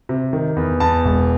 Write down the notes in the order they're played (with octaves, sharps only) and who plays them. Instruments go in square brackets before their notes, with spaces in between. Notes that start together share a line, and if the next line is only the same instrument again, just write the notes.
[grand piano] C3
D#3
E2
E2 A5
E1